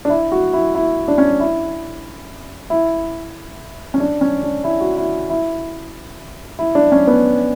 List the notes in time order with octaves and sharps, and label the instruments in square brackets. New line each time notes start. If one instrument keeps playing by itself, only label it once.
[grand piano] D4
E4
F#4
E4
E4
D4
C#4
E4
E4
C#4
D4
C#4
D4
E4
F#4
E4
E4
E4
D4
C#4
B3